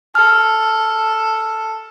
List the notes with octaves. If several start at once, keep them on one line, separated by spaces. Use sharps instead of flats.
A4 F6